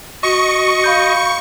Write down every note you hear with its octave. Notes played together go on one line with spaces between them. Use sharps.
F#4 D#5 C#6 C#7
F5 B5 G6